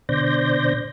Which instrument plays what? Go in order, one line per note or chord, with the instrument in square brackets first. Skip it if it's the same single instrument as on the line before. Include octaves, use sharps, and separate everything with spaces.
[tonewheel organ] B2 D3 C5 D5 G6 A#6